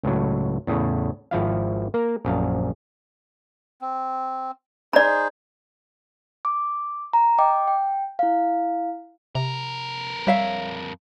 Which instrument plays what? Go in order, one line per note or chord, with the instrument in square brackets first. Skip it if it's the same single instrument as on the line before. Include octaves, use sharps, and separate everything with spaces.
[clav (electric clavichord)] C#2 A2 F#3
E2 A2 C#3
G#1 F3 E4 F5
A#3 A#4
A#1 F#2 F5
[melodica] C4
[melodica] D#4 G#4 C5 [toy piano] D5 B5
[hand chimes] D6
A#5
D#5 G5 D6
G5
E4 F5
[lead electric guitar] F2 A#4 [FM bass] C3
[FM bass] G3 [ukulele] C#5 E5 F5